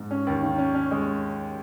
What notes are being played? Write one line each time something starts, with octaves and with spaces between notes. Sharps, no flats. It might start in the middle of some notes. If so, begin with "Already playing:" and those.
Already playing: G#2
C#4
D#2
D#3
C#4
C#4
G#3